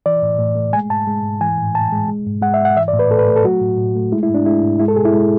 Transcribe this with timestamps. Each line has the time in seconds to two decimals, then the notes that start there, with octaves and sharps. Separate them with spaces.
0.06 E3 D5
0.22 A2
0.39 A2
0.56 A3
0.73 G#3 G#5
0.90 G#2 A5
1.07 G#3
1.24 G#2
1.41 E3 G#5
1.58 A2
1.74 A2 A5
1.92 G#3
2.08 G#3
2.26 G#2
2.42 G#3 F#5
2.54 E5
2.60 G#2
2.65 F#5
2.76 E3 E5
2.88 D5
2.94 A2
2.99 B4
3.11 A2 A4
3.19 B4
3.28 A3
3.36 A4
3.44 F#3 F#4
3.62 A2
3.78 A2
3.95 A3
4.12 G#3 E4
4.23 E4
4.29 G#2
4.34 D4
4.46 G#3 E4
4.63 G#2
4.79 G#3 E4
4.88 A4
4.96 B2 G#4
5.05 E4
5.13 G#3